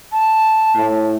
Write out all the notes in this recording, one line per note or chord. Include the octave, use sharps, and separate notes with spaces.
A5
A2